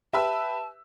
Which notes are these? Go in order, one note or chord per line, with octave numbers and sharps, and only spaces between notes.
G4 B4 E5 A5 E6